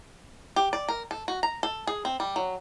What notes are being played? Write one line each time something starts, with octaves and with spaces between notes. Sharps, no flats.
G4
D5
A#4
A4
F#4
A#5
A4
G#4
C4
G3
F#3